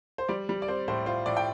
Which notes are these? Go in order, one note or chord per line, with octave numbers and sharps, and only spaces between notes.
C5
G3 D5
G3
D5
C4 C5
A2 C5
F4 C5
A2 D5
G5